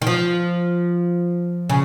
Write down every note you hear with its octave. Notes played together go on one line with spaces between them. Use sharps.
D#3
F3
C#3